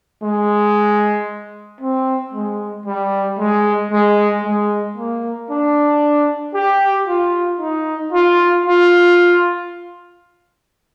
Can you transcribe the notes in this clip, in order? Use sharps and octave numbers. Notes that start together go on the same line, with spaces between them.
G#3
C4
G#3
G3
G#3
G#3
G#3
A#3
D4
G4
F4
D#4
F4
F4